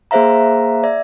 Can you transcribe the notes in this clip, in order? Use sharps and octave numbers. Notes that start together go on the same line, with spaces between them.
A#3 G#4 C5 E5 F5 A#5
D5 E5